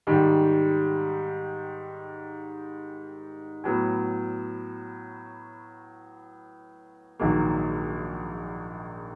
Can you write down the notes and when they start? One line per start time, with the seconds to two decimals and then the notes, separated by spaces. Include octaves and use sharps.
0.07 G#2 D#3 G3
3.64 A2 F#3 B3
7.20 A#1 G#2 D#3 F#3 A#3